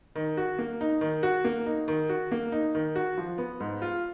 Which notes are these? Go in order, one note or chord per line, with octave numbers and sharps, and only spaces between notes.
D#3
F#4
A#3
D#4
D#3
F#4
A#3
D#4
D#3
F#4
A#3
D#4
D#3
F#4
F3
B3
G#2
F4